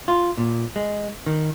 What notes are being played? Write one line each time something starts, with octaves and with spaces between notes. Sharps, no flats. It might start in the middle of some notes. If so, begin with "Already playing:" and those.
F4
A#2
G#3
D#3